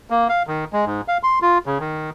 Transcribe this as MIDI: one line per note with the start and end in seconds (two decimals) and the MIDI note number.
0.10 0.28 58
0.29 0.43 77
0.47 0.65 51
0.73 0.85 56
0.86 1.01 44
1.08 1.18 77
1.23 1.39 84
1.42 1.58 65
1.66 1.78 49
1.80 2.10 51